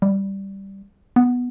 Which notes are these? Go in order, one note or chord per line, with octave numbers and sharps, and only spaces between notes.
G3
B3